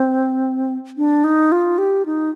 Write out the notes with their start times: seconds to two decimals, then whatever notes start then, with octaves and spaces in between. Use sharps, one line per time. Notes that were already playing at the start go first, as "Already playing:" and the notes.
Already playing: C4
0.97 D4
1.24 D#4
1.52 F4
1.78 G4
2.06 D#4